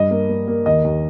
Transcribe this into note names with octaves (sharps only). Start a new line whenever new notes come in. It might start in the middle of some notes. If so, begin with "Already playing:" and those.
Already playing: G2 D#5
A#3
A#3
A#3
D#2 D#5
D#2